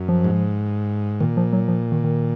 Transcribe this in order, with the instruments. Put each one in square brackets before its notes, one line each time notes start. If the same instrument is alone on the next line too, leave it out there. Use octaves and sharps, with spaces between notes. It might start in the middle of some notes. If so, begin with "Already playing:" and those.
Already playing: [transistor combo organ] F#2
[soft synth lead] F3
[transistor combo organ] G#2
[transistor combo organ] A#2 [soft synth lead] D#3
[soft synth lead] F3
F#3
F3
D#3
D#3